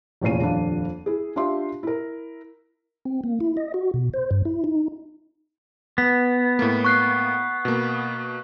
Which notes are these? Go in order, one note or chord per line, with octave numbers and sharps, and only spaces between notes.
F1 E2 A#2 C#4 C7 D#7
D#1 F2 D4 F5
E4 G#4
D4 F4 G4 E5 C6
E4 A#4
C4
A#3
E4
D#5
F#4
B2
C5
G2
E4
D#4
B3 B6
A2 A#3
C#6 F#6 C7
B2 A#3